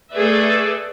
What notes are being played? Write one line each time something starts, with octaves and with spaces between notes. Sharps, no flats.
A3 G#4 A4 B4 D5 E5